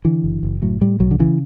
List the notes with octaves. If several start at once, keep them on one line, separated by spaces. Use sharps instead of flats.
D3 E3
F#1
F#1
A2 F#3
A2 G3
B1 F#3
D3
C#3 E3